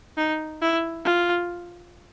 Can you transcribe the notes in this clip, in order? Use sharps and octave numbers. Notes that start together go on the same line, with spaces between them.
D#4
E4
F4